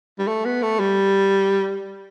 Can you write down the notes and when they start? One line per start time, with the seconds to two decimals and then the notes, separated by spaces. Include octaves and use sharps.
0.19 G3
0.27 A3
0.45 B3
0.62 A3
0.80 G3